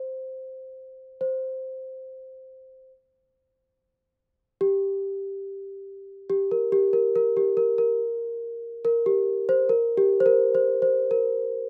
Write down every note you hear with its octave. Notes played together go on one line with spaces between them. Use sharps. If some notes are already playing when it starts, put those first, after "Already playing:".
Already playing: C5
C5
G4
G4
A#4
G4
A#4
A#4
G4
A#4
A#4
A#4
G4
C5
A#4
G4
C5
A#4
C5
C5
A#4